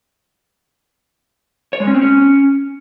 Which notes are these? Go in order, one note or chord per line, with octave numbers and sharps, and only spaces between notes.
C#5
G#3
C#4
C4
C#4